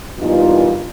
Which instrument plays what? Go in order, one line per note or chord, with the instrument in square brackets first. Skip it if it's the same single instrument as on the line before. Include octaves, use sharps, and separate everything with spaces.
[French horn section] E2 G2 A#2 D#4 F4